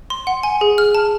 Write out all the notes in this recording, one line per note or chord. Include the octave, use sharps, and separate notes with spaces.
C6
F#5
G#5
G#4
F6
A5